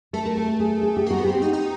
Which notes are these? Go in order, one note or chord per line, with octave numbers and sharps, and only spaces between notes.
A3 A4
A#4
A4
A4
G#4
G#4
G4
A#3 F#4
B3
G4
C4
D#4
D#4